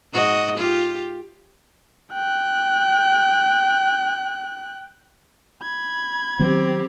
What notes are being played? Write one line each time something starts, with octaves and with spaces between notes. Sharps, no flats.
G#2 F#4 D#5
F4 G4
G5 F#6
B5 G#6
D#3 F#3 B3 C4 G4